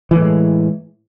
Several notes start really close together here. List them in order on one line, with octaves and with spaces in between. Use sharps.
E3 A2 G#3